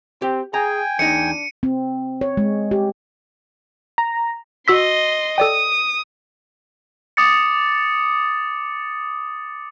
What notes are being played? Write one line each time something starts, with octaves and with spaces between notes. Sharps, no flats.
C4 G4
G#4 G5 G#5 A#5
E2 D4 D#4 C#7 D#7
C4
C#5
G#3
G4
A#5
F#4 D#5 C6 E6 B6
A4 D5 G5 D#6
D6 D#6 A6 C#7